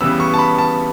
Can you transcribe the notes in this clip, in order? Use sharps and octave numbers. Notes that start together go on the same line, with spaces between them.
C#3 E3 G3 B3 E6
C#6
A5
B5
A5